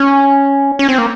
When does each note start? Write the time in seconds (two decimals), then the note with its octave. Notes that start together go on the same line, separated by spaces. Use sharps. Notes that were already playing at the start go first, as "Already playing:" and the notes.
Already playing: C#4
0.79 C#4
0.89 C4
0.98 A#3